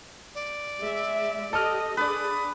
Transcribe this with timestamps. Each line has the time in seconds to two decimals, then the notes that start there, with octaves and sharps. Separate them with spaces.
0.35 D5
0.79 G#3 E5
1.53 G4 A4 D#5 F6
1.97 D4 G#4 B4 D5 D#6